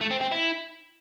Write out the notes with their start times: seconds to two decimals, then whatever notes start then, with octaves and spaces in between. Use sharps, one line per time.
0.01 A3
0.11 C4
0.21 C4
0.32 E4